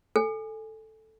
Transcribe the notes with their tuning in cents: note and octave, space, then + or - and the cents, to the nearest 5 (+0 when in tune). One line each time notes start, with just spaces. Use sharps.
A4 +0 G#5 -5